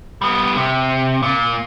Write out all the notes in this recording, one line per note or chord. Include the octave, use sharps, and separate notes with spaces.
G3 B3
C3
A#2